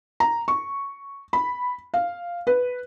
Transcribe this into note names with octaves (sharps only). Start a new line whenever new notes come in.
A#5
C#6
B5
F5
B4